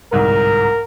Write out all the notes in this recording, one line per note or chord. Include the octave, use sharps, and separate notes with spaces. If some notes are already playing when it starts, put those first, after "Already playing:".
G1 C2 G#2 A#4